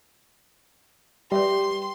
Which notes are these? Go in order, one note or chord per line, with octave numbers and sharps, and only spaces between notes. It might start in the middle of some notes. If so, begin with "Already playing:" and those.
G3 G4 B4 D5 E5 C6